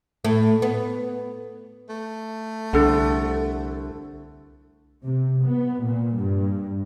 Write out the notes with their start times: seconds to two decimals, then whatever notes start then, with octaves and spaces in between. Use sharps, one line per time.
0.25 A2 A3
0.62 B3
1.90 A3
2.73 C2 D3 D4 A4 F#5
5.04 C3
5.45 B3
5.83 A#2
6.15 G2